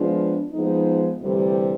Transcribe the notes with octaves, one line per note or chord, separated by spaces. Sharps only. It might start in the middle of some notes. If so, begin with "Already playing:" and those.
Already playing: F3 G#3 B3 D4 F4
F3 G#3 B3 D#4
D2 C3 E3 G3